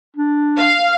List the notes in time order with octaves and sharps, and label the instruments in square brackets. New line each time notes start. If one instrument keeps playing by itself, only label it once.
[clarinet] D4
[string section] F5